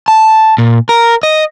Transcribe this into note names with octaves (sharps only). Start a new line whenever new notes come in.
A5
A#2
A#4
D#5